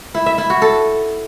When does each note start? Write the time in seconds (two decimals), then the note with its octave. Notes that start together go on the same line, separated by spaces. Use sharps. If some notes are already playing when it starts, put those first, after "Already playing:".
0.15 E4
0.26 E5
0.38 E4
0.50 F#4
0.62 A4